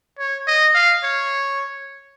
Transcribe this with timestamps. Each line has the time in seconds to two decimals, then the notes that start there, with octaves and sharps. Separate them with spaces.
0.19 C#5
0.47 D#5
0.75 F5
1.04 C#5